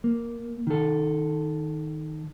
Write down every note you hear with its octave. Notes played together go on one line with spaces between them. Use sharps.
A#3
D#3 A4